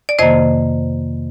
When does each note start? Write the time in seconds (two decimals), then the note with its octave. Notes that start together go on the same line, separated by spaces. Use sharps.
0.09 D5
0.19 F2 C3 D#3 A#3 C5 D#5